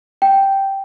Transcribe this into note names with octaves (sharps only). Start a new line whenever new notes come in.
G5